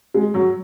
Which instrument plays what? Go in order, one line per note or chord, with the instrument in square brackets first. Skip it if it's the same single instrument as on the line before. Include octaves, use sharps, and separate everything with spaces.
[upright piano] G#3
F#3